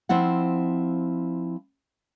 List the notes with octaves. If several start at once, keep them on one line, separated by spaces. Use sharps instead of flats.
F3 C4 E4 F#5